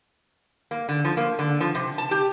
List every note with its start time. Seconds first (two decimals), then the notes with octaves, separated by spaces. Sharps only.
0.71 A#3
0.89 D3
1.05 F3
1.17 A#3
1.39 D3
1.60 F3
1.75 C3
1.98 A5
2.11 G4